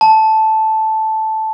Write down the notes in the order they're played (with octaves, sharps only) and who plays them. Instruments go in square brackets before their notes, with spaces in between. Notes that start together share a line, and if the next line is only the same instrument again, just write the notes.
[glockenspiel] A5